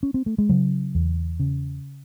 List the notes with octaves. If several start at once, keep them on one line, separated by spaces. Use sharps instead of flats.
C#4
C4
A3
G#3
C#3 F#3
E2
C#3